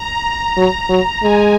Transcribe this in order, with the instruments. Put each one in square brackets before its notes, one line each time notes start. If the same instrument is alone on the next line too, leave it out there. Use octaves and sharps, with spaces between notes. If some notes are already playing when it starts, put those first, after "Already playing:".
Already playing: [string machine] A#5
[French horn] F#3
F#3
[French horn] G#3 [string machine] G#5